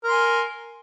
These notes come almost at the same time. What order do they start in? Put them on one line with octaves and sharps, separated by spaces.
A#4 C6 G#5